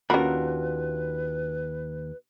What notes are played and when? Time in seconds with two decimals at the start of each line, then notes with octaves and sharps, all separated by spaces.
0.10 D#2 C#4 D4 F4 F#4 A#4 B4 B5